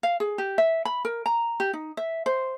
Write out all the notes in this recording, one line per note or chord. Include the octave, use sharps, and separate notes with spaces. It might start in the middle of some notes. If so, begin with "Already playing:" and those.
F5
G#4
G4
E5
B5
A#4
A#5
G4
D#4
E5
C5